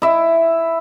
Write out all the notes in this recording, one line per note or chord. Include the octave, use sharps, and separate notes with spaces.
E4 E5